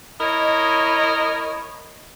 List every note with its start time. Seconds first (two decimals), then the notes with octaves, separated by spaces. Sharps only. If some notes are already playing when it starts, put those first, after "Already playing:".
0.20 E4 A#4 C#5 D#5